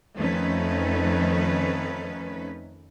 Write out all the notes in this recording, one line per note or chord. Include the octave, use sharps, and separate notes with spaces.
F2 D#3 A3 C#4 D#4 B4